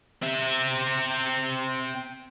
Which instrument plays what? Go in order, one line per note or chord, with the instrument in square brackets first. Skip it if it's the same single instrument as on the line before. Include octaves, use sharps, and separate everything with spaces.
[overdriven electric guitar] C4 E5